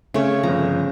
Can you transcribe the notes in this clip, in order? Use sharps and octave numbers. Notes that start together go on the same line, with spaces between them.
C#3 A3 C#4 C#5
G1 F3 A#5